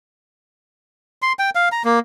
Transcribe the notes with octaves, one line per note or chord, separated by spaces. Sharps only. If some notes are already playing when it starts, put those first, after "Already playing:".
C6
G5
F5
A#5
A#3